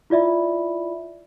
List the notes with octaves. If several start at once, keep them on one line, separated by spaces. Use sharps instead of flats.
E4 F4 D5 E5 B5